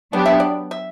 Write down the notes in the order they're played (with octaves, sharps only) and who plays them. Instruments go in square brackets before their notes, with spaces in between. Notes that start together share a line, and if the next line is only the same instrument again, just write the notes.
[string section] F#3 B3 D4 G4 [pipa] D5
[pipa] E5
D5
E5